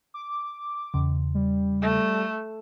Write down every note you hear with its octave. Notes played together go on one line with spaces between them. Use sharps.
D6
E2 C#3
G3
A3